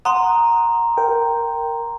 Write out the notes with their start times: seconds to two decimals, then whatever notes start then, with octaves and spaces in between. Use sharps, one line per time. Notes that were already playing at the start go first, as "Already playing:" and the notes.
0.05 F#5 A#5 C6 D#6
0.97 A#4 G5